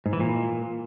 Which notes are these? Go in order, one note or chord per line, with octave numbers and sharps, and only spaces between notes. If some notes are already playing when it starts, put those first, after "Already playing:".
G#2
E3
A#2